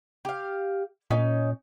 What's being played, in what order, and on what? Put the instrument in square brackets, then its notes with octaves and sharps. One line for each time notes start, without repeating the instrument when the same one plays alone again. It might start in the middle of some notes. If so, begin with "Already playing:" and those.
[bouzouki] G4 F5
[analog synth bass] A#2 [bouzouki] C#4 D#4